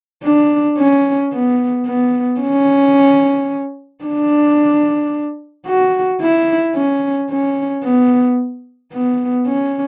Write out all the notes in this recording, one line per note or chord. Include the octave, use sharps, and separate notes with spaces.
D4
C#4
B3
B3
C#4
D4
F#4
E4
C#4
C#4
B3
B3
C#4